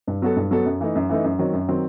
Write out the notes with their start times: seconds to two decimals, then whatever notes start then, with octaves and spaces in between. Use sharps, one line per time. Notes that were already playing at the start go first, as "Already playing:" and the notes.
0.07 G2
0.22 F#3 B3 F#4 A4
0.36 G2
0.51 F#3 B3 F#4 A4
0.65 F#2
0.81 E3 A3 D#4
0.95 F#2
1.09 E3 A3 D#4
1.24 F#2
1.39 D#3 F#3 C4
1.53 F#2
1.69 D#3 F#3 C4